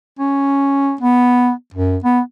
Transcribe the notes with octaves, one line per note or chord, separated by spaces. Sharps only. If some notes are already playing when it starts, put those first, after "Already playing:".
C#4
B3
F#2
B3